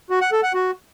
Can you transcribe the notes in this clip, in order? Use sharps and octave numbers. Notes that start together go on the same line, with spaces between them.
F#4
F#5
A4
F#5
F#4